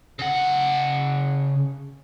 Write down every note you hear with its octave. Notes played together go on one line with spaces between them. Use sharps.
C#3 F#5